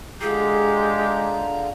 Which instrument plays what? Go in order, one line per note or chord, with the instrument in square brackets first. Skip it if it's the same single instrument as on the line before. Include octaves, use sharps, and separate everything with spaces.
[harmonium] D3 F4 A#5 [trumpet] G#3 [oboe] G4 [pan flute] G#4